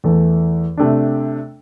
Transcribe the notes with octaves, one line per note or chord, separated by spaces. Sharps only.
E2 E3 A3
C3 A3 D4